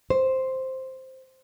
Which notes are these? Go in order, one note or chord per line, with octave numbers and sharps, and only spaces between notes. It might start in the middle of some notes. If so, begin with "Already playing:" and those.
C5